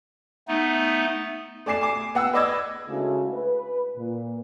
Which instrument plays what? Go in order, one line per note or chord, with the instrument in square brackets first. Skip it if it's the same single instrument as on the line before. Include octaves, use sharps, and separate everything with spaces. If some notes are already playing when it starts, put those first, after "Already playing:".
[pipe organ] A3 B3 D#4
[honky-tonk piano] A3 D5 G#5 D6 C7 E7
G#5 D6
B3 F#5 E6
B4 D5 D#5 D6 E6 G#6
[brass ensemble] C#3 G#3 A3 D4 E4 F#4
B4
A#2